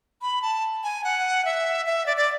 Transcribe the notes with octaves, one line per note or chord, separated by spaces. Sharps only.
B5
A5
G#5
F#5
E5
E5
D5
D5